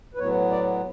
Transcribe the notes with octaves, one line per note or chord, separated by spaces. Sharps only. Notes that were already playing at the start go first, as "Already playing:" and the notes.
B4
A2 F#3 B3 C#5
D5